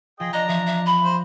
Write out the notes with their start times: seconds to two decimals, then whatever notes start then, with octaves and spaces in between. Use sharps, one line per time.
0.20 F3 G#4 D#5 G5
0.33 D4 D#5 A#5
0.48 F3 E5
0.66 E5
0.86 B5
1.04 C5